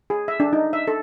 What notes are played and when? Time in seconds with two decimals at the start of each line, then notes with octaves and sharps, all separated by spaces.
0.10 G#4
0.28 E5
0.40 D4
0.53 D#4
0.73 E5
0.88 A4